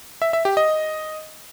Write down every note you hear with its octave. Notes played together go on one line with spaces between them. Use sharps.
E5
E5
G4
D#5